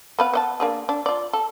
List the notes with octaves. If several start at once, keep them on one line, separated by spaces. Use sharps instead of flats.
B3 B4 F5
B3 D#5 A5
A#3 D4 G#4
D4
F4 D5
A4